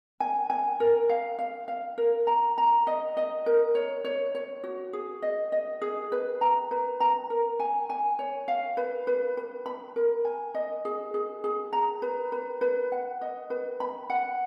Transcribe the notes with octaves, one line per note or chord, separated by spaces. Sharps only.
G#5
G#5
A#4
F5
F5
F5
A#4
A#5
A#5
D#5
D#5
A#4
C#5
C#5
C#5
F#4
G#4
D#5
D#5
G#4
B4
A#5
B4
A#5
A#4
G#5
G#5
C#5
F5
B4
B4
B4
B5
A#4
G#5
D#5
G#4
G#4
G#4
A#5
B4
B4
B4
F#5
D#5
B4
B5
F#5